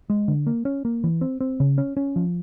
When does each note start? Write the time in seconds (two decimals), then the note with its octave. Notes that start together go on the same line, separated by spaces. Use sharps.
0.10 G#3
0.28 D3
0.47 A#3
0.65 C#4
0.85 A#3
1.04 E3
1.21 C4
1.40 C4
1.60 C#3
1.78 C#4
1.97 C#4
2.16 F3